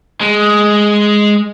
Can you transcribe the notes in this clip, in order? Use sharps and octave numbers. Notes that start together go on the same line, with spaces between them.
G#3